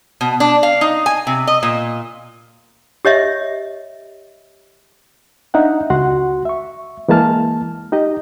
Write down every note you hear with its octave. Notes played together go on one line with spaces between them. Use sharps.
B2
D4
F5
D#4
G#5
C3
D#5
A#2
G4 C#5 D#5 E5
D4 D#4 E5 F#5
C#2 F#4 F#5 C6
E5 C#6
E3 G#3 A#3 A5 F6
D#4 G4 D#5